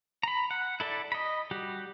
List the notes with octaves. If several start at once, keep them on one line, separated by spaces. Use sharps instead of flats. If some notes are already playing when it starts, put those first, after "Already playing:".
A#5 B5
F#5
E4 A4 D5 E5
D#5 B5
G3 F#4 G4